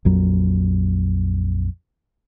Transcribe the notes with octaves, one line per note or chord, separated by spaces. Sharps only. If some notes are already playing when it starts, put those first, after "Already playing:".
A#1 F2 F#3